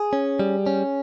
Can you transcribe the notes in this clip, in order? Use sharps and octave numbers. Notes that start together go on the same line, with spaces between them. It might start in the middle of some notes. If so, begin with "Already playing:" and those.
Already playing: G#4
C#4
G3
C#4